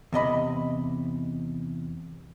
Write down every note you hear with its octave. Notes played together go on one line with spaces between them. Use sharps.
E2 C3 D#5 B5